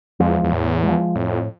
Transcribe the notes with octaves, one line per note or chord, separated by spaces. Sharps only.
F2 F3 G#3
E2
E2
A2
G#3
F3
F2 A2